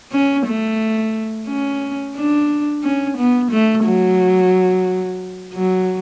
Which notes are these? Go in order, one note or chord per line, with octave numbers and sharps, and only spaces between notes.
C#4
A3
C#4
D4
C#4
B3
A3
F#3
F#3